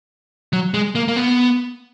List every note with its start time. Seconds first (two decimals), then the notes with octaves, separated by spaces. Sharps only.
0.53 F#3
0.74 G#3
0.95 A#3
1.08 A#3
1.16 B3